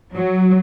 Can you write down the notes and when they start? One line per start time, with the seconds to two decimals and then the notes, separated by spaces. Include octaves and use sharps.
0.13 F#3